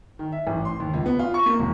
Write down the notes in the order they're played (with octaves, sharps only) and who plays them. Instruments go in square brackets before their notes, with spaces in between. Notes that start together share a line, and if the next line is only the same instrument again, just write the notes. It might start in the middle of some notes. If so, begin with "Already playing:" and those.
[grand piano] D#3
E5
A1
C6
D#2
C#2
B3
F4
C#6
A#3
E1